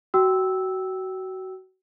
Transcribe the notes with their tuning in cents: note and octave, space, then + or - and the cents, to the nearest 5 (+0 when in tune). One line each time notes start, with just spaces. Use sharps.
F#4 +20 G5 -15 E6 -10